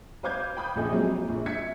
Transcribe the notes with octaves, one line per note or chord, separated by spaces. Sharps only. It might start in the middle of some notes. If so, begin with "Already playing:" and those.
B4 C5 F5 D6 G6 G#6
G5 B5 D#6 G6
A#1 C#3 A4 D#5 G#5
F3 F#3 G#3 A#3 C4
A#1
E5 G#6 B6 C#7